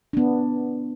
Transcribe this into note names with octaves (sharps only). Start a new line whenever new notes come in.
B3 D4